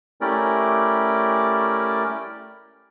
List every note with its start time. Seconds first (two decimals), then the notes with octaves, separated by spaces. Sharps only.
0.21 A3 C#4 E4 G4 A#4 D5